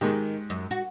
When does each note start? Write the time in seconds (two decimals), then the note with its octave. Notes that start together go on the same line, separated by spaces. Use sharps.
0.01 G#2 D#3 G#3 G4
0.50 F#2
0.71 F#4